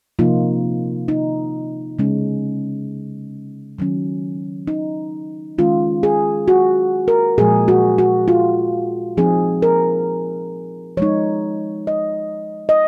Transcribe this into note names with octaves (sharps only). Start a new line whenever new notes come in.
C3 F3 A#3 D#4 F4
D#4
C#3 G#3 C#4
D#3 F#3 C#4
D#4
D#3 G#3 C#4 F4
G#4
F#4
A#4
A#2 F3 G#3 G#4
F#4
F#4
F4
F3 C4 D#4 G#4
A#4
F3 G#3 D#4 C#5
D#5
D#5